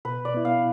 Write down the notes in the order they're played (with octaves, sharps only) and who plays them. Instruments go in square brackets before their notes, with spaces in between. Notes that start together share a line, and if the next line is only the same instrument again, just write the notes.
[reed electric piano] B2 [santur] B4
[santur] D5
[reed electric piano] B3 E4
[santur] F5